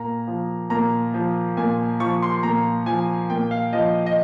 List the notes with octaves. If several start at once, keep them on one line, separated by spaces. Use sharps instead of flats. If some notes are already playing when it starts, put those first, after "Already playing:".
Already playing: A#2 A#5
F3
A#2 A#5
F3
A#2 G#5
F3 C#6
C6
A#2 A#5
F3 G#5
A#2 G5
F5
F3 D#5
D#5